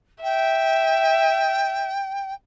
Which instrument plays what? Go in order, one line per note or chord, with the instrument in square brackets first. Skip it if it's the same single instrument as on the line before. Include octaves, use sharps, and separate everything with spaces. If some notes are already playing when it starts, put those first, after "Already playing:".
[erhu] E5 [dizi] G5